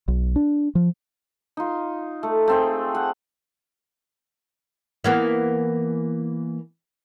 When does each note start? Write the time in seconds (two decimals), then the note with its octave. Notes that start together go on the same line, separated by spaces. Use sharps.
0.08 B1
0.36 D4
0.75 F3
1.57 D#4 F4
2.23 A3
2.48 A3 C4 G#4
2.95 F#5
5.04 E3 A#3 B3